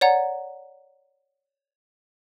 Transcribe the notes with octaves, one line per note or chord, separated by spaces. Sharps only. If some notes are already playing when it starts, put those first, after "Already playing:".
C#5 D5 F#5 A#5